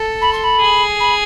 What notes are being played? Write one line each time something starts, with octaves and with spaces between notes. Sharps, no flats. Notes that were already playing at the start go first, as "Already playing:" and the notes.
Already playing: A4
B5
C6
B5
G#4
B5